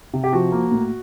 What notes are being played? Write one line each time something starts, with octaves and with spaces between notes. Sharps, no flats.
C3
G4
F3 F#4
A#3
A2